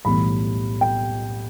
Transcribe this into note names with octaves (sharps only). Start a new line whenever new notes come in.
B1 A2 E3 G3 B5
G5